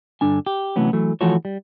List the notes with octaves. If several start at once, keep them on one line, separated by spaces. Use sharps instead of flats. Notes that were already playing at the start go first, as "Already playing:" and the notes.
G2 D3 D4 G#5
G4
C3 E3 F#3 A3 B3 C#4
E3 F#3 A3
E3 F3 A3 F#4 A4 C#5
G3